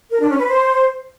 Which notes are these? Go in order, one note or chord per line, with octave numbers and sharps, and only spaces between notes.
A#4
D4
C#4
B4
C5